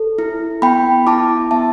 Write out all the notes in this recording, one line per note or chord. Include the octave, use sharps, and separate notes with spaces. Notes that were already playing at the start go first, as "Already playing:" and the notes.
Already playing: A4
E4
B3 G5 B5
E4 A5 D6
B3 E5 A5